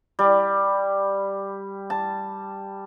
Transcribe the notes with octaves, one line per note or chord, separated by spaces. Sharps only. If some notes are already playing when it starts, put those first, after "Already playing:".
G3
A5